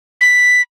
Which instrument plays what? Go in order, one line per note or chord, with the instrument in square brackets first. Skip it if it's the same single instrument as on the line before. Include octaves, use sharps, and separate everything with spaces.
[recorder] B6